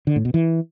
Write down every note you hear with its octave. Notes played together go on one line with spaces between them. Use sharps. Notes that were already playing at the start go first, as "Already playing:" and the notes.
D3
A2
B2
E3